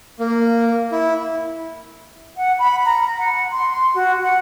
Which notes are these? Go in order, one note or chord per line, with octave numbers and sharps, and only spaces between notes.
A#3
E4
F#5
B5
A#5
F#5
C6
C6
F#4
F#5